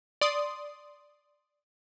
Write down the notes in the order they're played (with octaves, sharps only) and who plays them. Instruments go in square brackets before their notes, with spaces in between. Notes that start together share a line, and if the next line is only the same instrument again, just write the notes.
[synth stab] D5 C6 D#6